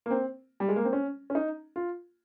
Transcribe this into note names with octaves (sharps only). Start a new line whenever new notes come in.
A#3
C4
G3
G#3
A#3
C4
C#4
C#4
D#4
F4